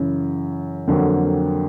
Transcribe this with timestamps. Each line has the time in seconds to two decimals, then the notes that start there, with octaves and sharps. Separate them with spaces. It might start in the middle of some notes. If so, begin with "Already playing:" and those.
Already playing: F#2 C#3 E3
0.87 F2 D3 F#3 A#3